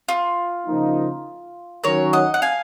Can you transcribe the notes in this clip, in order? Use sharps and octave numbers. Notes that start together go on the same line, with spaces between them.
F4
C#3 F3 A#3 D#4
D#3 F#3 C#4 A#4 C#5
D#5 F#5
F#5
F5 G#5